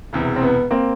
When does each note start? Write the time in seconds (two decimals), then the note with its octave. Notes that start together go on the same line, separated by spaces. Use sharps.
0.13 E1 E2 C3
0.36 C4
0.42 B3
0.71 A#3 C4